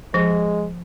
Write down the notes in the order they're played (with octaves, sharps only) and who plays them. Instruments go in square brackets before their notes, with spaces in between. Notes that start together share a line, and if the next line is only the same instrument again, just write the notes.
[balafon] F3 [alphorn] G#3